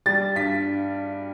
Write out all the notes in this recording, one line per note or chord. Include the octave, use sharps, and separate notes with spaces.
G3 A6
G2 B6